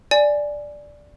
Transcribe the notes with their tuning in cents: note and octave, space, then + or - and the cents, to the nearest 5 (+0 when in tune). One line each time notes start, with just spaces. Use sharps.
D5 +0 G#5 +5